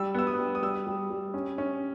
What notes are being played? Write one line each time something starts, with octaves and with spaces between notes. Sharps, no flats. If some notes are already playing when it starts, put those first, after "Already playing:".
Already playing: G3 E6
B3 E6
D#6
G3
D#6
G3 E6
G3
G3
C#4
C#4